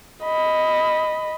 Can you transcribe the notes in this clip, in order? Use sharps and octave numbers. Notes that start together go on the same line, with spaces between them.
D#5 B5